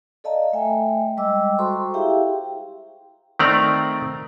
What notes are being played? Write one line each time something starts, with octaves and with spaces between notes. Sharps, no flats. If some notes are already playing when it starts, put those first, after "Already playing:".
A4 D5 D#5 F5 A5 A#5
A3 E5 G5 G#5
G3 G#3 D#5 G5 D6 E6
F#4 A4 C5 A#5 C6 C#6
E4 G4 G#4 E5 F5 G5
D#3 A3 C4 D5 A#5